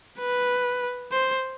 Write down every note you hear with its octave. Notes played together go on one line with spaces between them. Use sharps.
B4
C5